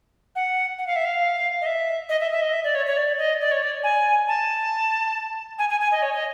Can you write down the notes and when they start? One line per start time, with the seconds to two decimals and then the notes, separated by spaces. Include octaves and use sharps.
0.36 F#5
0.78 F#5
0.87 F5
0.96 E5
1.05 F5
1.61 D#5
1.66 E5
2.09 D#5
2.20 E5
2.32 E5
2.42 D#5
2.53 E5
2.64 D5
2.75 C#5
2.86 C#5
2.97 D5
3.18 D#5
3.41 D5
3.52 C#5
3.63 D5
3.83 G#5
4.28 A5
5.59 G#5
5.70 G#5
5.81 G#5
5.92 D#5
6.02 C#5
6.13 D#5